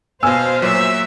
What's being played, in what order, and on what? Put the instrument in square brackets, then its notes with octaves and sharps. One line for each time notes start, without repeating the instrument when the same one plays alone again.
[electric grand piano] B2 B3 [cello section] C5 [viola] F5 [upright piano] G#5 E6
[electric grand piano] A#2 F#3 [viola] E5